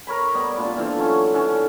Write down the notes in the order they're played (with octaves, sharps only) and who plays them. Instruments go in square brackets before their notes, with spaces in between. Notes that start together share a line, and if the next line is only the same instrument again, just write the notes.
[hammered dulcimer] A#4 C#5 B5
G3 B3
A#2 D4 F4
E3 F4 A4 C5
F#3 C#4 C#6
D3 E3 C#4 A5